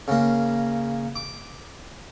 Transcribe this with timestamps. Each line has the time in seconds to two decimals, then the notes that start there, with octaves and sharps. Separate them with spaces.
0.08 C#3 A#3
1.16 D6